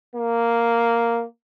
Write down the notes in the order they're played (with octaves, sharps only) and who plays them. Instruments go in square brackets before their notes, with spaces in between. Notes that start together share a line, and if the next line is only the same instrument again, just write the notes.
[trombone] A#3